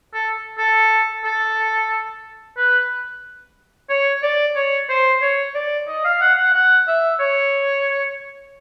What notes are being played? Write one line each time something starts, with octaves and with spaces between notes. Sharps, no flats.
A4
A4
A4
B4
C#5
D5
C#5
C5
C#5
D5
D#5
F5
F#5
F#5
F#5
E5
C#5